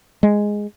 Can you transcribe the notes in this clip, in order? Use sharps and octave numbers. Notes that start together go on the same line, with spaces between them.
G#3